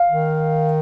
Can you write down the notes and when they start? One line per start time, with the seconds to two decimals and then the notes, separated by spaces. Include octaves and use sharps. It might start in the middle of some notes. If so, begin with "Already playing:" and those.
Already playing: F5
0.10 D#3